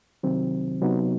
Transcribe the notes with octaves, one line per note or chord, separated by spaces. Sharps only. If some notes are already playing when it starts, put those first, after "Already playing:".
C2 C3 D#3 F#3 C4
C3 F#3 B3 D#4